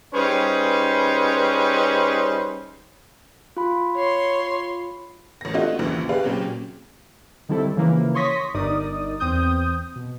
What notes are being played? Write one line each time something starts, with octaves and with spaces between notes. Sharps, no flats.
G3 C#4 D#4 G#4 B4 C5
F4 B5
C#5 C6
A1 A#6
A3 C4 D4 F4 F#4 D#5
A#1 D#2 C#3 E3
G4 G#4 B4 D5 F5
A#2 C#3 F#3 C4 C#4 G4
D3 D#3 G3 C4 E4 A4
C#3 E3 F3 A#3 E4
C#5 C6 C#6 D#6 A#6 B6
G1 G2 D#4 A#4 D5 D#6
E2 C4 D#6 G6
B2